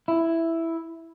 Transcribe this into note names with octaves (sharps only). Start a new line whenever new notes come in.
E4